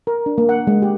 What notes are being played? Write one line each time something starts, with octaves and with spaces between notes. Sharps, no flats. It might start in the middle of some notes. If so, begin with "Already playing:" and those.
A#4
D4
A#3
F#5
G#3
G4